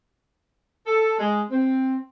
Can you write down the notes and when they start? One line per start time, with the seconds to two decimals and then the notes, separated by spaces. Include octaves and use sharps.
0.86 A4
1.19 G#3
1.51 C4